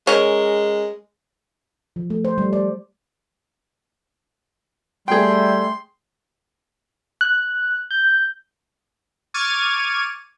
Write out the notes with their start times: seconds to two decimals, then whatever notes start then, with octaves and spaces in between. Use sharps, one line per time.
0.07 G#3 C#4 A#4
1.96 F3
2.10 A3
2.25 C5
2.38 G3
2.53 D5
5.08 G3 A3 G#4 G5 C6
7.21 F#6
7.91 G6
9.34 C#6 D6 F6 G#6 A6 D#7